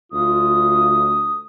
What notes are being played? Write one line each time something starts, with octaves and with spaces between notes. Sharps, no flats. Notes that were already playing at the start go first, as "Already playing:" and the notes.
D2 F4 D#6